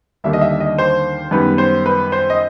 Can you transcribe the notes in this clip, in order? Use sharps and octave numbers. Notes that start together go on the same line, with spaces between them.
D#2 D3 G3 A#3 D4 E5
D#5
E5
D#5
C5
F#2 D#3 G3 B3 B4
C5
B4
C5
D#5